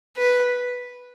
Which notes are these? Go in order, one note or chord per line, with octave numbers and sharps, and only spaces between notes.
B4